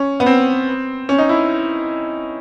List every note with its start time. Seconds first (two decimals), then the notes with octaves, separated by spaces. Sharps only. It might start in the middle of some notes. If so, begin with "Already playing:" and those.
Already playing: C#4
0.20 B3
0.26 C4
1.09 C#4
1.18 D#4
1.29 E4